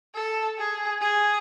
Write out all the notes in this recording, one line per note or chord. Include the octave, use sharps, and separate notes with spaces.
A4
G#4
G#4